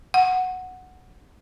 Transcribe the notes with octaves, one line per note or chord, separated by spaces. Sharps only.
F#5